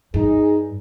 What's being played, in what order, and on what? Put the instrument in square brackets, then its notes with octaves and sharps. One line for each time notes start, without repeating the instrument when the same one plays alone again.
[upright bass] G2 [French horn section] D#4 G#4